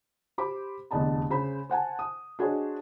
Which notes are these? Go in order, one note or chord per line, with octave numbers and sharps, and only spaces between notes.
G4 C5 B5 D6
F1 E2 D3 D#5 A5 B5
C#3 C5 B5
C5 F#5 G#5 A5
D#6
D4 F#4 G#4 C5 C#5 D#5